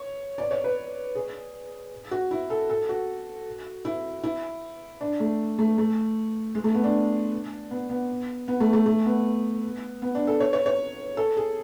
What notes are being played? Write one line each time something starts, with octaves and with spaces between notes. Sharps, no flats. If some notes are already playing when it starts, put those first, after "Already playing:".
Already playing: C#5
D5
C#5
B4
G#4
F#4
E4
A4
A4
F#4
E4
E4
D4
A3
A3
A3
G#3
A3
B3
D4
B3
B3
B3
A3
A3
A3
B3
B3
D4
A4
C#5
C#5
C#5
A4
G#4